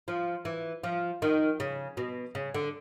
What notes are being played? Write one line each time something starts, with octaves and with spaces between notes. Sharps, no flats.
F3
E3
F3
D#3
C#3
B2
C#3
D3